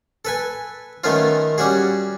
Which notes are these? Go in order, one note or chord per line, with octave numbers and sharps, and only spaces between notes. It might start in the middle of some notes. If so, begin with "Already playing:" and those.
A4 B4 G#5
D#3 A3 B3 C#4 F4
G3 C#4 F#4 G#4